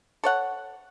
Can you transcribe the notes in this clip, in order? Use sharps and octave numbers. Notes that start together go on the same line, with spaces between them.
A4 C#5 F#5